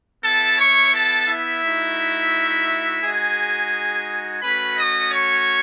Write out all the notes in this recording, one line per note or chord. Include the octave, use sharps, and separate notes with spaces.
B3 E4 A4 A5
C#5 C#6
A4 A5
E4 E5
A3 D#4 F#4
G#3 D#4 F#4 G#4 G#5
A3 C#4 F#4 B4 B5
D#5 D#6
C#5 C#6